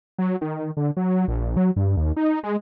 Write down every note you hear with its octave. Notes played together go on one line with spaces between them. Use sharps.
F#3
D#3
D3
F#3
A#1
F#3
G2
D#2
D#4
G#3